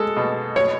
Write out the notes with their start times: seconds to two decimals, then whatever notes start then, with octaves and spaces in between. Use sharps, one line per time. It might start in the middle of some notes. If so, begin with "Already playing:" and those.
Already playing: G#3 A4
0.17 B2
0.56 C#5